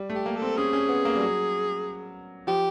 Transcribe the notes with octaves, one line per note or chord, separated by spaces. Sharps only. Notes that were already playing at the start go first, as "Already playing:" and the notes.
Already playing: G3
A3
G4
A#3
A4
C4
C#4 G#4
C#4
B3
A#3
G3
F#3
F3 G4